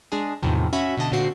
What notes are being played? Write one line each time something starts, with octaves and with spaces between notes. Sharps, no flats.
G#3 D4 G#4
E2 A2 C3 D#3 F3
C#4 F#4 E5 B5
B2 D3 D#5 A5
A#2 D3 C4 F#4 C7